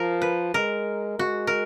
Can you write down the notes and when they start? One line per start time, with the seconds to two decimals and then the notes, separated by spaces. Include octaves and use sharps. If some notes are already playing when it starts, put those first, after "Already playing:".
Already playing: F3 A#4
0.22 B4
0.54 G#3 A#4
1.19 G#3 F#4
1.47 A#4